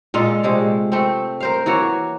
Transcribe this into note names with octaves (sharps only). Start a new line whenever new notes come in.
A#2 G#3 F4 A4
C3 G#3 A3
A3 C4
A#4 C5 F5
E3 A#3 F#4 C#5